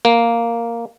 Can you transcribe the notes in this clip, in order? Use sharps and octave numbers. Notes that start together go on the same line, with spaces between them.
A#3